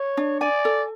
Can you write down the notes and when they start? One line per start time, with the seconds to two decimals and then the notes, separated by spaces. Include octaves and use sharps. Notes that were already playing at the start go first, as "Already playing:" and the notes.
Already playing: C#5
0.17 D4
0.41 D5 G#5
0.65 A4